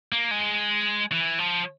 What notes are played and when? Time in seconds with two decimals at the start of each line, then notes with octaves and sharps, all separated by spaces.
0.12 A#3
0.31 G#3
1.12 E3
1.39 F3